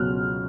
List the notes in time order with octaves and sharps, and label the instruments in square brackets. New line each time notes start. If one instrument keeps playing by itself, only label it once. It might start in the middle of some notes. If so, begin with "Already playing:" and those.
Already playing: [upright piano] C#2 B2 F#3 F6 F#6